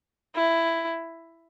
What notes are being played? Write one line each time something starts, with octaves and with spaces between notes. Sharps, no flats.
E4